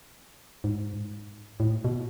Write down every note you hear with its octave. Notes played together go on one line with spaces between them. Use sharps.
G#2
A2
B2